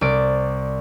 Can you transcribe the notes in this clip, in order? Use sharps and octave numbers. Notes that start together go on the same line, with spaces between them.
C2 D5 D7